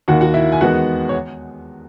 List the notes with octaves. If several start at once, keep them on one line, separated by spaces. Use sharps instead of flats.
D#2 D#3 A#3 F#4 F#5
F#4 F#5
E4 E5
G#5
E2 D#3 G#3 B3 F#4 F#5
C#5